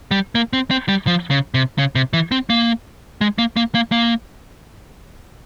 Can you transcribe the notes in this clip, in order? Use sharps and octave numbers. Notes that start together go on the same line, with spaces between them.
G3
A#3
C4
C4
G3
F3
C#3
C3
C#3
C3
E3
C4
A#3
G#3
A#3
A#3
A#3
A#3